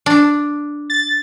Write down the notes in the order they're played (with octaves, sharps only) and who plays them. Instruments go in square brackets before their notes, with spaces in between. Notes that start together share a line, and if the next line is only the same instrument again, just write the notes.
[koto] D4
[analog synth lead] A6